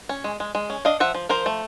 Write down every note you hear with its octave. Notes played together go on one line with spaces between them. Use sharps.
C#4
G#3
G#3
G#3
C#4
D4 D#5 F5
F3 E5 F#5
F3
F3 A#4 C5
A3